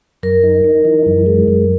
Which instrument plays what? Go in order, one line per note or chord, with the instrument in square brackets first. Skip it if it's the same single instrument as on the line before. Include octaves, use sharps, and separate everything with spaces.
[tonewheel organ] F#2 [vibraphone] A#4
[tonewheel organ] D#4
D#4
E3
F#2
G#3
F#2